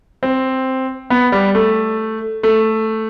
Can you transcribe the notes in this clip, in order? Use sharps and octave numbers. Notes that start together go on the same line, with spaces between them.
C4
B3
G3
A3
A3